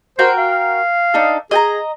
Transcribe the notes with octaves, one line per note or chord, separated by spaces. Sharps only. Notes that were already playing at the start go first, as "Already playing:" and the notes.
F#4 A#4 C5 G5
F5
D4 D#4 A4
G#4 D#5 G5 A#5